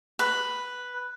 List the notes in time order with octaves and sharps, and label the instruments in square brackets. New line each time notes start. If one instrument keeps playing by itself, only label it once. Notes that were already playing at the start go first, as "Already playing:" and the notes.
[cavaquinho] B4